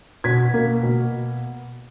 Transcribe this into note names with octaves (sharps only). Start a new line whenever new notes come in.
B2 G#6 B6
A#3
B2